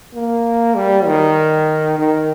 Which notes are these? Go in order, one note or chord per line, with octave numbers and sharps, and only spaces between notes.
A#3
G3
D#3
D#3